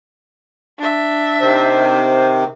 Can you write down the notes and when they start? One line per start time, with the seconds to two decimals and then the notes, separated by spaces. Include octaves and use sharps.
0.79 D4 E5
1.40 C3 D#3 C5